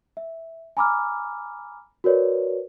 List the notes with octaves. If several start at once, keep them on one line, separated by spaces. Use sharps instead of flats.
E5
G#5 A#5 B5 D6 E6 F6
F#4 A#4 B4 C#5 D5